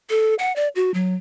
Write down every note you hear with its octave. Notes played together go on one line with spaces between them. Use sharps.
A4
F#5
D5
F#4
F#3